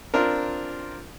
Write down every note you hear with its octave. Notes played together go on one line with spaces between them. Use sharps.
C4 D4 F4 A#4